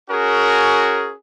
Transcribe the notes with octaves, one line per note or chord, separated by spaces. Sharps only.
C#4 F#4 G#4 A#4